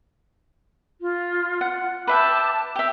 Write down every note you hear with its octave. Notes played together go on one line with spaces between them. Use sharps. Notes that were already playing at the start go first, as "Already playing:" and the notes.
F4
F#5
B4 E5 G5 A5 D6
G4 E5 G5